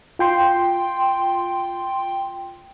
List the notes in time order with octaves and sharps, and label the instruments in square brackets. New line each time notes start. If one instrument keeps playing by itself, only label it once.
[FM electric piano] F4 G5 C6